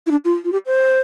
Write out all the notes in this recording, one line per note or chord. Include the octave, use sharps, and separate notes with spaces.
E4
D4
F4
F4
G4
C5